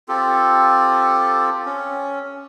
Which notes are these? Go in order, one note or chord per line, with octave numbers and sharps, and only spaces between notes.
C4 F4 G4 A4
C#4